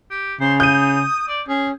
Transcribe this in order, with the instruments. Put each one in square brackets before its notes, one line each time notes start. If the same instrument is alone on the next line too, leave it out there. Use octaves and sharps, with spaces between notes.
[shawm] G4
[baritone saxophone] C#3 [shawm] C5
[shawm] D#6 [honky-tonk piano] G6 D#7
[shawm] D5
[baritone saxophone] C#4 [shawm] G#4